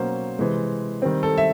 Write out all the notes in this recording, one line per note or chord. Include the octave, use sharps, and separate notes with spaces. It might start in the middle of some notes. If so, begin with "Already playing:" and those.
Already playing: B2 F#3 A#3 C#4 C5
C3 E3 G#3
D#3 G3 C4
A4
E5